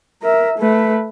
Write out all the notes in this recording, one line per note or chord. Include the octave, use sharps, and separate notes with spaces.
A#4 E5
A3 B4